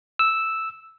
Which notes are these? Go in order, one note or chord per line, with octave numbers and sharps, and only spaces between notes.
E6